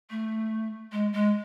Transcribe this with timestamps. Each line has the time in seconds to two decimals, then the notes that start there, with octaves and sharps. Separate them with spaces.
0.10 A3
0.92 G#3
1.13 G#3